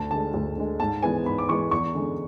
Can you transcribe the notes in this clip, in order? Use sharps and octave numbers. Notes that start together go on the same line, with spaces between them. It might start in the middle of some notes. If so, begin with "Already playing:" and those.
Already playing: D2 A5
D3 G#3 A5
D2
D3 G#3
G#2 A5
E3 G#3 B3 G#5
G#2 B5
D6
E3 G#3 B3 C#6
E2 C#6
D3 G#3 C#4